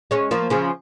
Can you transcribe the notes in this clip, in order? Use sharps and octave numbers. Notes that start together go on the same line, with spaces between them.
G#3 C#4
F3 A#3
C#3 F3